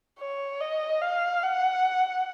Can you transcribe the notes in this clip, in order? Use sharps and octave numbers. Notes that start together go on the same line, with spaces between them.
C#5
D#5
F5
F#5